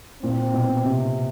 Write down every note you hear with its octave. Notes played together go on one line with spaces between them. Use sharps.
A#2 C4
B2
C3